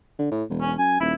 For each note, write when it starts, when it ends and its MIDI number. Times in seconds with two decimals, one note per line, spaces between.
0.19 0.28 50
0.32 0.44 45
0.50 0.76 28
0.61 0.72 61
0.78 0.99 42
0.78 0.96 80
1.00 1.15 27
1.00 1.14 64